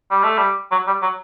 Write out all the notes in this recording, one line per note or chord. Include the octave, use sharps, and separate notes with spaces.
G3
A3
G3
F#3
G3
F#3